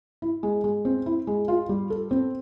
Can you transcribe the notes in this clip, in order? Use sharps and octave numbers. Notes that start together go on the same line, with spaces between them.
E4
G#3
G#3
C4
E4
G#3
F4
G3
A4
C4